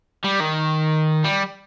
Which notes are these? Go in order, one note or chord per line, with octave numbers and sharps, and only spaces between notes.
G3
D#3
G3